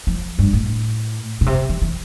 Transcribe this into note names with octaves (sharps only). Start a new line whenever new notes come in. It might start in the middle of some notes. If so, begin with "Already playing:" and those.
F3
G2
A2
B2
C3
E3
E3